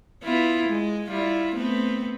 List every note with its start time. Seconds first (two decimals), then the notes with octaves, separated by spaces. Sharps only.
0.23 B3 E4 F4
0.68 G#3
1.06 G3 E4 F4
1.54 A3 B3 C4